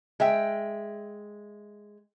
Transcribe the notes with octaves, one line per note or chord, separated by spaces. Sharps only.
G#3 E5 G5